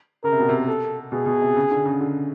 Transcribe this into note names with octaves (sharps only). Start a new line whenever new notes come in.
C#3 A#4
C3
B2
C3
A4
B2 G#4
B2
C3
C#3
D3
C#3
D3